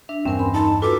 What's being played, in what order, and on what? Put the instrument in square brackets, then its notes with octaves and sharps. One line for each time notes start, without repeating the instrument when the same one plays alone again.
[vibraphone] D4 [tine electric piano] E5
[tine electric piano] E2 G2 [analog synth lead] C4 [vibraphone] C#4 A#4 G#5
[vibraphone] B5 C6
[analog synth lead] D#4 [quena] A5
[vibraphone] F4 F#4 B4 [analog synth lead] A4 [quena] D6